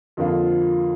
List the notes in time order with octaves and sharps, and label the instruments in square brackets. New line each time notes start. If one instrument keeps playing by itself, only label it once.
[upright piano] F2 D3 F3 A#3 F4